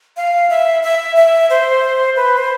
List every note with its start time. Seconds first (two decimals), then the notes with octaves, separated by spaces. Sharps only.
0.17 F5
0.50 E5
0.83 E5
1.16 E5
1.50 C5
2.16 B4
2.38 C5